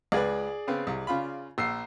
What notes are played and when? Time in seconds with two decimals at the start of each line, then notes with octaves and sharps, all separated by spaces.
0.12 C#2 G#4 B4 D5
0.67 C#3 B3 C4
0.87 C2
1.07 C#3 F4 B5
1.58 A#1 E6 C7